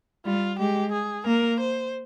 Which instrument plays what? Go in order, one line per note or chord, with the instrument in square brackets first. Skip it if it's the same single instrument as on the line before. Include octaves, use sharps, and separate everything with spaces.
[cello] G3 [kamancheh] F4
[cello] G#3 [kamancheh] G4
[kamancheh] G#4
[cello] A#3 [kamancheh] A#4
[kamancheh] C5